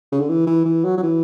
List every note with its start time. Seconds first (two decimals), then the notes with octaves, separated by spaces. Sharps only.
0.12 C#3
0.20 D3
0.29 E3
0.47 E3
0.65 E3
0.84 F#3
0.97 F#3
1.03 E3